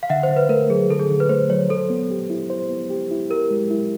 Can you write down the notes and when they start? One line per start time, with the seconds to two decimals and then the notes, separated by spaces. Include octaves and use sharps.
0.03 F5
0.10 D3 E5 F#5
0.23 C5
0.29 D3
0.37 B4
0.49 A3 A#4
0.70 F#3 G#4
0.90 D3 A4
0.99 G#4
1.10 D3
1.20 B4
1.29 A3 C5
1.50 F#3 C#5
1.70 A4 C5
1.90 B3
2.10 G4
2.30 E4
2.50 C5
2.70 B3
2.90 G4
3.11 E4
3.30 G4 A#4
3.51 G#3
3.71 E4